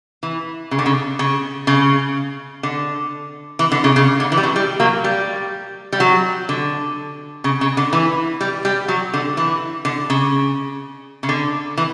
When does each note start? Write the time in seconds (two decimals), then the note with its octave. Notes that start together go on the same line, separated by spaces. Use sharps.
0.23 E3
0.71 C#3
0.79 D3
0.86 C#3
1.19 C#3
1.67 C#3
2.63 D3
3.59 E3
3.72 D3
3.84 C#3
3.96 C#3
4.20 D3
4.32 E3
4.38 G3
4.43 F#3
4.56 G3
4.80 F#3 A#3
5.04 G3
5.93 G3
6.00 F#3
6.49 D3
7.44 C#3
7.61 C#3
7.77 D3
7.93 E3
8.41 G3
8.65 G3
8.88 F#3
9.14 D3
9.37 E3
9.85 D3
10.10 C#3
11.23 C#3
11.29 D3
11.77 E3